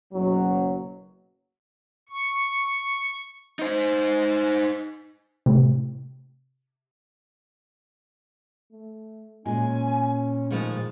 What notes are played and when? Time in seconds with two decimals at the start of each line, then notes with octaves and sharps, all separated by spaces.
0.13 F#1 B2 F#3
2.09 C#6
3.59 D#4 C5
5.46 A2 C3
8.72 A3
9.46 A#2 G#3 C#4 G#5
10.51 A2 D#3 F3 G#3 G#4